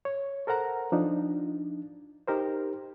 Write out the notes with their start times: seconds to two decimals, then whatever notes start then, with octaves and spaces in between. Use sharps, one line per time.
0.05 C#5
0.47 A4 A#4 C5 F#5 A#5
0.92 F3 D4 D#4
2.28 D#4 G4 A#4 C5